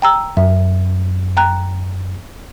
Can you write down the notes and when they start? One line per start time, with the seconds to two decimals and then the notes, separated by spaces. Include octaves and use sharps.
0.02 G5 A#5 E6
0.37 F#2 E5
1.37 G5 A#5 F#6